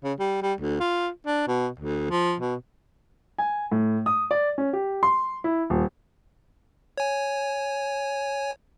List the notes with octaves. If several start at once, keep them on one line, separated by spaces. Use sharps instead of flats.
C#3
G3
G3
D2
F4
D4
B2
D2
F3
B2
G#5
A2
D#6
D5
C#4
G4
C6
E4
D#1
C#5 G#5